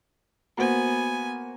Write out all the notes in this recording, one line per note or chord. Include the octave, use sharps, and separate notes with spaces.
A#3 B3 F#4 C5 G#5